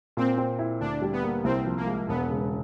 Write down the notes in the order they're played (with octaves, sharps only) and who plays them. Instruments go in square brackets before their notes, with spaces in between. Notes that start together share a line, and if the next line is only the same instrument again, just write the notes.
[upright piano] A#2 [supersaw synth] C4
[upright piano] C4
E4
[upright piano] D2 [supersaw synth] D4
[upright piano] G3
[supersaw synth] B3
[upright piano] A#3
[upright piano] C2 [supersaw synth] C4
[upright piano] F3
[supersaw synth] A#3
[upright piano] G#3
[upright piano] E1 [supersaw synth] B3
[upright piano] C#3